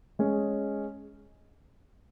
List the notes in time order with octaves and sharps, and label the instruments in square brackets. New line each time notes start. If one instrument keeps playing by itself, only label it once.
[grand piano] G#3 C#4 G#4